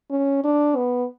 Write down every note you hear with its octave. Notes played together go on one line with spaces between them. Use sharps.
C#4
D4
B3